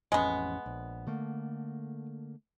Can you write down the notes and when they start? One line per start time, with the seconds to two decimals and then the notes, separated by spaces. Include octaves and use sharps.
0.12 A1 F2 G#3 B3 C#4
0.66 A#1
1.07 D3 A3 A#3